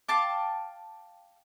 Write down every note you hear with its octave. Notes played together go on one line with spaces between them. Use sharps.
F5 G5 A5 D6